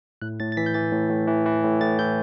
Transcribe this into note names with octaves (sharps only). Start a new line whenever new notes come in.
A2 F#6
A2 A6
A6
E3 B6
G6
E3 A6
A2
A2
E3
E3
A2
A2 A6
E3 G6